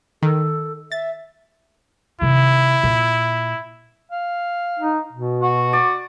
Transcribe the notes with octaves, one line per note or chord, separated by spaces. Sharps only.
D#3 A4
E5 A6
C3 D#3 E4
A#2
F5
D#4
B2
F#4
D5